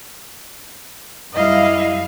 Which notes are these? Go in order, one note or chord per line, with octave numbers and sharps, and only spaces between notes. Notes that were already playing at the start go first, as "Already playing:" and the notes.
F#2 G3 E4 D#5 F5